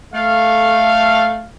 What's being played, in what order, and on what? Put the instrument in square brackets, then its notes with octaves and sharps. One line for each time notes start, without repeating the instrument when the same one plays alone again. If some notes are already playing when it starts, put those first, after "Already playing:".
[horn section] A3 F5